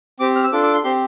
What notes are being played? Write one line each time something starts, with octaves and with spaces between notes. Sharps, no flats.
C4 G4 D6
F6
E6
D4 F4 A4 D6
D6
C6
C4 G4 C6